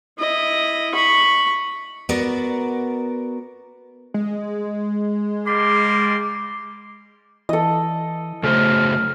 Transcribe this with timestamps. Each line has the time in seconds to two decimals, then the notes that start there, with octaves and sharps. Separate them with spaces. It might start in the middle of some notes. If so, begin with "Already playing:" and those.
0.18 E4 D#5
0.95 B5 C#6
2.09 B3 F#4 A#4 D5
4.14 G#3
5.46 G3 A#3 C6 D6
7.49 E3 A4 D#5
8.43 C#3 F#3 A3 C5 F6